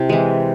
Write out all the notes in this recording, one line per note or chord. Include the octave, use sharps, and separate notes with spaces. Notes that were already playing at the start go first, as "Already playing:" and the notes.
Already playing: C3 E4
E3 G#3